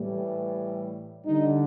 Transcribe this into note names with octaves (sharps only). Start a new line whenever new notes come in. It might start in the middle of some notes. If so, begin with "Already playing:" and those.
Already playing: A2 E3 G3
D3 G3 D#4